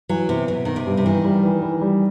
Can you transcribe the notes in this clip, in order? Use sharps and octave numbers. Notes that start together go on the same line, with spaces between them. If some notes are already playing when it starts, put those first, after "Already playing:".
E3 F#3
C3 B3
B2 B3
D#3 D#4
C3
G2
C3
D#3 E3
G3
E3
E3
G3